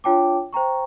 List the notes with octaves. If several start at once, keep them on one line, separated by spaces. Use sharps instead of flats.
D4 F4 C#5 G5 A5 D6
C5 G5 A#5 C#6